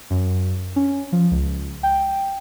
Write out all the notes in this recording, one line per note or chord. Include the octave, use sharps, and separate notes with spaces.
F#2
C#4
F3
C#2
G5